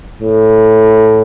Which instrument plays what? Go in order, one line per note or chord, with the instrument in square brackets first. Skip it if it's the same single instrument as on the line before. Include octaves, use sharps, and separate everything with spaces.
[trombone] A2